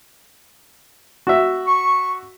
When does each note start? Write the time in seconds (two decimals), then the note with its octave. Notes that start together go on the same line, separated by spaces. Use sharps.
1.27 F#4 E5
1.67 C#6